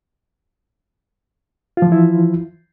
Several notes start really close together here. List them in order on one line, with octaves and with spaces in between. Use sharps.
F4 F3 E3 E4